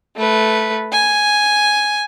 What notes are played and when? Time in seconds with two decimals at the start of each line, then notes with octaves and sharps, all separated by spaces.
0.17 A3 B4
0.92 G#5